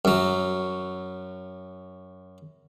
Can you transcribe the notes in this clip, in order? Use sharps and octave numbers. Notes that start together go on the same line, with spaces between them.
F#2 F#3